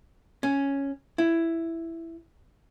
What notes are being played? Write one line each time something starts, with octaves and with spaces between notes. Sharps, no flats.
C#4
E4